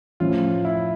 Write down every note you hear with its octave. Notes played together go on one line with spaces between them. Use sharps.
A2 F3 C#4 F4
E4